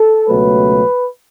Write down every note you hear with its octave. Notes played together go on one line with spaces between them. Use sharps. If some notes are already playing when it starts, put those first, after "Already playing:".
Already playing: A4
C#2 B2 F#3 A3 B4